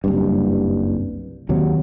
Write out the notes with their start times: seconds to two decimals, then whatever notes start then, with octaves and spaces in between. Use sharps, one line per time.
0.04 F#1 C2 G2
1.49 D#2 C3 F#3